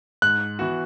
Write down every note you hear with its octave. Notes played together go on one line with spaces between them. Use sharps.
G#2 F#6
E3 B3 F#4